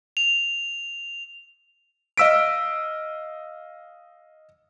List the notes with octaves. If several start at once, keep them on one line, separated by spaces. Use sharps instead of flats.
F7
D#5 F5 E6 B6 D7